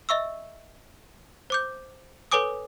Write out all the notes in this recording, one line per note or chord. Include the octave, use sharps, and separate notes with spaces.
D#5 E5 C#6 E6
C5 D6 G6
A4 B4 C#5 G#5 D6 D#6